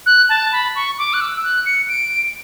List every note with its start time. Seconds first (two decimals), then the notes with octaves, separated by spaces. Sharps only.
0.06 F#6
0.29 A5
0.52 B5
0.75 C#6
0.98 D6
1.13 F#6
1.21 E6
1.44 F#6
1.66 C#7
1.89 D7